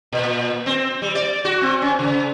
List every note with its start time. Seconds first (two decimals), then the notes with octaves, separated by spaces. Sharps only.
0.12 A#2
0.66 C4
1.02 G3
1.15 D5
1.45 F#4
1.62 C4
1.82 C#4
1.99 C#3